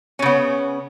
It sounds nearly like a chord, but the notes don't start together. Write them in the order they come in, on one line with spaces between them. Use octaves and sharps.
C#4 C#3 B3